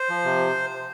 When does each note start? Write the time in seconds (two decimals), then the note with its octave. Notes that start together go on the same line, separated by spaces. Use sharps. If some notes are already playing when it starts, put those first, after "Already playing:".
Already playing: C5
0.09 F3
0.25 C3